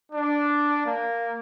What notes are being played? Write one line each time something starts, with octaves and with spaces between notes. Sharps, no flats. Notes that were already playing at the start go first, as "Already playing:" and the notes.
D4
A#3